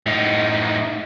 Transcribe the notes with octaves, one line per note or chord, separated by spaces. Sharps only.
A2 D#4